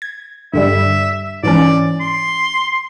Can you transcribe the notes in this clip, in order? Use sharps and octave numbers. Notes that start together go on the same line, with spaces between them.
G#6
G2 D3 G3 E5
G#2 E3 C#4 D5
C6